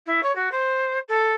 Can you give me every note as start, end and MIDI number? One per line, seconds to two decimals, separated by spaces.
0.06 0.21 64
0.23 0.34 73
0.35 0.49 66
0.52 0.99 72
1.08 1.35 69